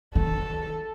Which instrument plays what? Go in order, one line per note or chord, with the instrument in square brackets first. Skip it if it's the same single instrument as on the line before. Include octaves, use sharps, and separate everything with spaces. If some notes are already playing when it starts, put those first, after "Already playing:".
[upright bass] D#3 [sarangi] A4